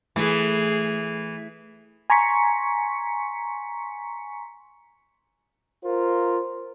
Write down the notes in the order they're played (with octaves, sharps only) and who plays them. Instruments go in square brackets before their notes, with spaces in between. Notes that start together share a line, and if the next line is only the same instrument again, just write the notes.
[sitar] E3 [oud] A3 [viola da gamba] G#4
[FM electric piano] G#5 A#5 C6 C#6 B6 C#7
[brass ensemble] F4 A#4 C5